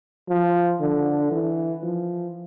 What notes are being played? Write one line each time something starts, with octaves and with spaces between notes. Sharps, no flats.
F3
D3
E3
F3